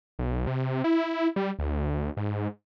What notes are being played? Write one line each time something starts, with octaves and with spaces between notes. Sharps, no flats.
B1
C3
E4
G3
D2
G#2